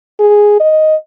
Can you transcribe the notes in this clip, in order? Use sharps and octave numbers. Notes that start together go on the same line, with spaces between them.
G#4
D#5